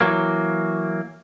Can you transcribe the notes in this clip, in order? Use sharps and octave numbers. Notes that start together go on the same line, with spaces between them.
E3 F#3 A#3